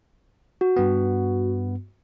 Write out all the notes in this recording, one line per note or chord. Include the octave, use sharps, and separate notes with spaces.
F#4
G2 B3